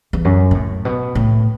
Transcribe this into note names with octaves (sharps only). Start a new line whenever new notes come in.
E2
F#2
B2
A2
B2
A2